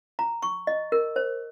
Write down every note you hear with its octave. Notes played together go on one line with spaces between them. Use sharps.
A#5
C#6
D#5
A#4
C5